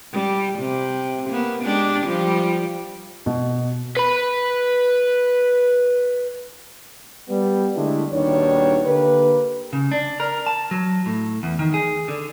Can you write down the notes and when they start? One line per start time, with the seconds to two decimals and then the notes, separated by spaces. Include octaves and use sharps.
0.13 G3
0.59 C3
1.30 A#3 B3
1.63 G#3 D4 G4
2.03 F3 G3
3.26 B2
3.97 B4 B5
7.28 G3 B3
7.76 D3 G#3 A3 D4 E4
8.11 D#2 B2 D#3 G3 D4 C#5
8.86 D3 A#3 G4 B4
9.73 C#3
9.91 D4
10.20 A#4
10.47 A5
10.71 F#3
11.06 A2
11.43 E2
11.59 D#3
11.74 G#4
12.08 D3